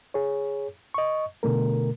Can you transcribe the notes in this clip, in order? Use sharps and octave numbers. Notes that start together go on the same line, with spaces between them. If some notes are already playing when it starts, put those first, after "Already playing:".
G#4 C#5
D#5 C#6
B2 D3 A3 A#4